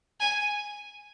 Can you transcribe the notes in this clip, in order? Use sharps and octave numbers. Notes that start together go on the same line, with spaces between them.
G#5